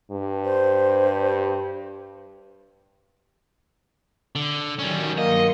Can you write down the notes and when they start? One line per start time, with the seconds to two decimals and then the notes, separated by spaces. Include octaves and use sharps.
0.11 G2
0.45 C5
4.36 D3
4.79 D#3 F#3 G3 C#4
5.18 G2 A#3 D#5 C6 C#7